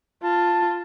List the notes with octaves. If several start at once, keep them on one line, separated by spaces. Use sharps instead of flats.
F4 A5